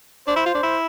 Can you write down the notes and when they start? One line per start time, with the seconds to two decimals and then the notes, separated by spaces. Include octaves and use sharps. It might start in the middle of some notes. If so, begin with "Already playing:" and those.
0.27 D4 C5
0.36 E4
0.46 F4
0.54 D4
0.63 E4